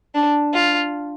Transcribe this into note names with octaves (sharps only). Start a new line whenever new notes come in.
D4
F4